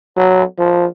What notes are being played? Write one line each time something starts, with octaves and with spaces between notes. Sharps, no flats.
F#3
F3